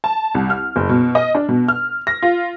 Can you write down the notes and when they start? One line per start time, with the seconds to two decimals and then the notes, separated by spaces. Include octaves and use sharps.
0.04 A5
0.35 C2
0.50 F6
0.76 F#1
0.89 B2
1.15 D#5
1.35 D4
1.49 B2
1.68 F6
2.07 A#6
2.22 F4